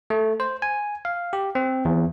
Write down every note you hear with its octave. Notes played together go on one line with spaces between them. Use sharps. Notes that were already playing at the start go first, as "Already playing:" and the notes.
A3
C5
G#5
F5
G4
C4
E2